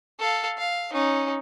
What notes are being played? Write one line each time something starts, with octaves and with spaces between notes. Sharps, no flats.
A4 F5
F5
C#4 D#4